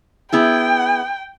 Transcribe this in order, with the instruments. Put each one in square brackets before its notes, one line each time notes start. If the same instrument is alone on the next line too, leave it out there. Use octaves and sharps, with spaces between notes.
[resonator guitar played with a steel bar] B3 E4 G#4 [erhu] G5